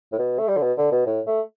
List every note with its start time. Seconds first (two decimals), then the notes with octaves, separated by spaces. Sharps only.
0.13 A2
0.19 B2
0.39 A3
0.48 G3
0.57 D3
0.63 B2
0.78 D3
0.92 B2
1.07 A2
1.27 A3